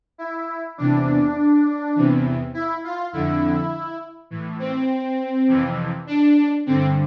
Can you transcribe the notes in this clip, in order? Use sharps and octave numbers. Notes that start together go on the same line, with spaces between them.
E4
E2 C3 E3 D4
E2 C3 E3
E4
F4
F2 D3 E4
A2 E3
C4
F2 C3 E3
D4
G2 D3 C4